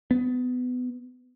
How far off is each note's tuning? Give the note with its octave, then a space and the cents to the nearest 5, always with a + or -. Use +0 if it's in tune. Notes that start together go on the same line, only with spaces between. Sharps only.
B3 +20